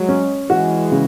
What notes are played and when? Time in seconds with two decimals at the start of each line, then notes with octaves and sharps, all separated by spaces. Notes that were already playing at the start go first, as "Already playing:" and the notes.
Already playing: F#3 G#3
0.09 C#4
0.50 E3 G#3 F#4
0.92 C#3